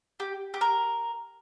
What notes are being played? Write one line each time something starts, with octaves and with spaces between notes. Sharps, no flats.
G4
G4
A#4